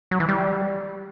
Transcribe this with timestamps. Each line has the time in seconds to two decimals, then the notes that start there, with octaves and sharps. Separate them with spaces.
0.11 F#3
0.20 E3
0.29 G3